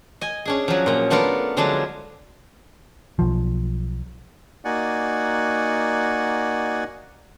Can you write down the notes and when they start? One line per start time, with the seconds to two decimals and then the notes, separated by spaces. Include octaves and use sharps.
0.21 D#5 G#5
0.45 C#4 D4 G#4
0.68 F3 F#3
0.86 A#2 A#5
1.10 A3 B3 D4 F4 A#4
1.57 D3 F3 F#3 G#3 D4
3.19 B1 F3
4.65 A#3 D#4 F#4 D5 F#5 G#5